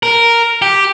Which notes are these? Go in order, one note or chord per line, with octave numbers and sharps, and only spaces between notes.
A#4
G4